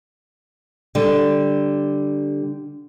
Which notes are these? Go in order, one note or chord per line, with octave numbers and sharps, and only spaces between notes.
D3 G3